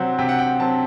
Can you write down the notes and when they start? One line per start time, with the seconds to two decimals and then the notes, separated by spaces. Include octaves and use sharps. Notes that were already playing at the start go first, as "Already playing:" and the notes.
Already playing: C3 F#3 C4 F#5
0.18 C3 G5
0.29 F#5
0.39 G5
0.60 F#3 C4 A5